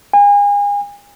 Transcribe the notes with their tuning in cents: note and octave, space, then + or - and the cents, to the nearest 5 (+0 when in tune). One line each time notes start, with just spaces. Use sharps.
G#5 -35